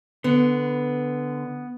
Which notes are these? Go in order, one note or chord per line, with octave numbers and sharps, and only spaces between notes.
D3 B3